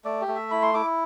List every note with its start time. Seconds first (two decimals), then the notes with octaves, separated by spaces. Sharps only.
0.05 A3 D5
0.21 G4
0.28 A3
0.36 E5
0.51 E4 B5
0.62 C6
0.74 E4 D6